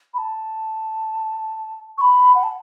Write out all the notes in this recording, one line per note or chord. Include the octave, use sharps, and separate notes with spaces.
B5
A5
C#6
B5
F#5
A5